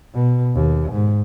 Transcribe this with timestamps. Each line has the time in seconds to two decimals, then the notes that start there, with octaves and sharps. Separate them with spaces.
0.14 B2
0.55 D#2
0.92 G#2